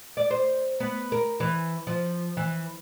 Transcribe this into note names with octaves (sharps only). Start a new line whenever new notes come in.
D5
C5
B3
A#4
E3
F3
E3